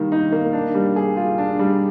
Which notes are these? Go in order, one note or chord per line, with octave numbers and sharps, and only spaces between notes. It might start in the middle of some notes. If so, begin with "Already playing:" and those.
Already playing: D#3 G3 A#3
D#4
A#3
D4
G3
G#4
F4
D4
G3